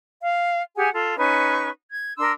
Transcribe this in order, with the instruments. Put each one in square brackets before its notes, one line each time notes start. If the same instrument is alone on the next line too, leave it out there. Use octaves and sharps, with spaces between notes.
[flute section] F5
G4 G#4 F#5 G#5
F4 A4
C#4 D#4 B4 C#6
G#6
D4 A#4 C6 E6